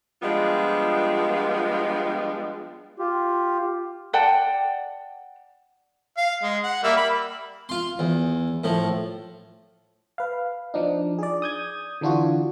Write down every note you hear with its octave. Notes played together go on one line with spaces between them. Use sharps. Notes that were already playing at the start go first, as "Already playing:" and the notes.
F3 G3 G#3 B3 D4 F4
F4 G4
D5 F#5 G5 A5
F5
G#3
F#5
G3 A#3 E5
B5
F4 C6
E2
A2 F3
B4 F5
F3 D4 D#4
G#4 D5
D#6 G6 G#6
D3 E3 D4 F4 F#4